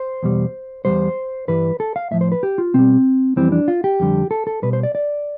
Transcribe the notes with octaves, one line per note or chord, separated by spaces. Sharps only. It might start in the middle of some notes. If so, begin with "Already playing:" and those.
Already playing: C5
E2 B2 G3
E2 B2 G3 C5
G2 E3 G3 B4
A4
F5
A2 F3 E5
C5
B4
G4
F4
B2 G3 C4
F2 E3 G3 C4
D4
F4
G4
F2 D3 G3
A4
A4
B2 G3 B4
C5
D5
D5